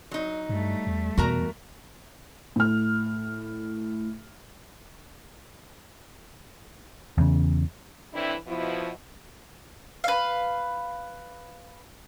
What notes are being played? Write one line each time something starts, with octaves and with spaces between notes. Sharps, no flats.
F#3 D#4
G2 G3 A3
E2
E2 B2 F#4 A#4 A#5
A2 F6
E2 C#3
A2 E3 C4 D4 E4
B2 F3 E4
B4 F5